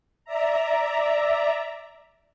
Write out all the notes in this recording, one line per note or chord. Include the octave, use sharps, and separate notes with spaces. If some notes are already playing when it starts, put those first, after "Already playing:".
D5 E5 A#5